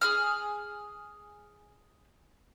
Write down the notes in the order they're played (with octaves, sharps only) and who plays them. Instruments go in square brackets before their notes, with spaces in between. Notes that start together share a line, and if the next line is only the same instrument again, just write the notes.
[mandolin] G#4 D#6 F6